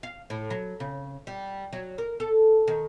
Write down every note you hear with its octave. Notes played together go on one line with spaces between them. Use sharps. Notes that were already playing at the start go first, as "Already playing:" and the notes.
F5
A2
F#3
C#3
G3
F#3
A#4
A4
D#3